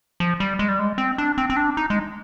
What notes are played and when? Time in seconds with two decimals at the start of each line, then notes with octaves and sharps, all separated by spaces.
0.20 F3
0.40 G3
0.59 G#3
0.69 G3
0.79 G#3
0.98 C4
1.18 D4
1.38 C4
1.50 C4
1.57 D4
1.77 D#4
1.90 G#3